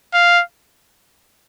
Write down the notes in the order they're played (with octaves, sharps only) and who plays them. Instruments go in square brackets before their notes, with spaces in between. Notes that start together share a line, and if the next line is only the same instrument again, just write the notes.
[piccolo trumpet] F5